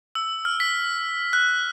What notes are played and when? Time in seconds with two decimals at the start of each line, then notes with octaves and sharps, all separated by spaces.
0.15 E6
0.45 F6
0.60 B6
1.33 F#6